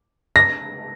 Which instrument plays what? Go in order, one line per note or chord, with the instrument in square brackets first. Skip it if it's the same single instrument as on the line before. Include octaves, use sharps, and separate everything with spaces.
[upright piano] A#6